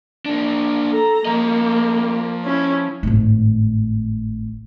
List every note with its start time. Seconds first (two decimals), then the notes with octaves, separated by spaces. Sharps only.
0.26 A#3 D4
0.90 A4 A#5
1.25 F3 A#3 D#5
2.44 C#4 E4
3.03 G#1 A2